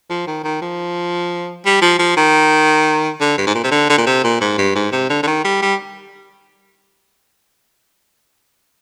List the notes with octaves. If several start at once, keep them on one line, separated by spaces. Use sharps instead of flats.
F3
D#3
D#3
F3
G3
F3
F3
D#3
D3
G2
G#2
A#2
C3
D3
D3
A#2
C3
A#2
G#2
G2
G#2
C3
D3
D3
D#3
G3
G3